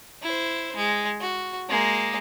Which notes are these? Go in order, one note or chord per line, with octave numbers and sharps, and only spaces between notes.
E4 C5
G#3
F#4
G#3 A#3